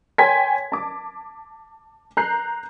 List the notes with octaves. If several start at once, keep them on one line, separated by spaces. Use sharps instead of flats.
C#5 G5 G#5 C6 G#6 B6
A5 D6
A#5 F#6 G6 C7